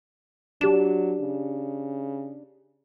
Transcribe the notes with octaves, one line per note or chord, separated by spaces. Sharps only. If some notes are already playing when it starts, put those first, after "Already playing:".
F#3 D4 G4 E7
C#3